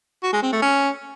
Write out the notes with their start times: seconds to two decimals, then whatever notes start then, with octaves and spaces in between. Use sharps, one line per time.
0.23 F#4
0.33 G#3
0.42 C4
0.52 A3
0.62 C#4